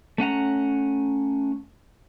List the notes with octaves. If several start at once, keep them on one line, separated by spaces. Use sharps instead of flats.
A3 C#4 F#5 A#5